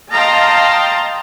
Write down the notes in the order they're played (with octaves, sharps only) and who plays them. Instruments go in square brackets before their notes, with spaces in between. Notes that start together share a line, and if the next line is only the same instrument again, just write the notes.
[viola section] D#5 F5 G5 A5 A#5 C6